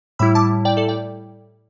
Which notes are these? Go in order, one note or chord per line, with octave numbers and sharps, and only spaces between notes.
A2 G3 E4 B5 E6
A5 D6
D5 G5
A4 D5
D5 G5